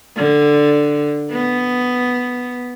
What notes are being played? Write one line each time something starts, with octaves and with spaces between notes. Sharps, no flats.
D3
B3